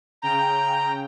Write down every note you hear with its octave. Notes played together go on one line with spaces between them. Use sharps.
C#3 G5 A#5